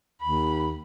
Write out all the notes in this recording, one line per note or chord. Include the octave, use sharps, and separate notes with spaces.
D#2 B5